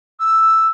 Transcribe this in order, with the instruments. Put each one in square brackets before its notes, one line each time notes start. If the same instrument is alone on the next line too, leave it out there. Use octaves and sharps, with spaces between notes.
[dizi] E6